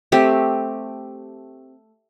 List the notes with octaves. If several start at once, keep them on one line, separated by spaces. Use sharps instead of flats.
A3 C4 G4